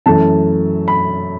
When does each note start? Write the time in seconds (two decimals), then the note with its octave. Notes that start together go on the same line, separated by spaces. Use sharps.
0.06 F#2 E3 A3 A5
0.88 B5